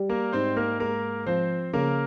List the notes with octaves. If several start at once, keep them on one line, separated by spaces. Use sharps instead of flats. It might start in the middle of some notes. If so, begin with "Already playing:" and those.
Already playing: G3
A#3 A#4
G#2 C4 C5
A#3 A#4
G#3 A#3 A#4
F3 C4 C5
C#3 A#3 A#4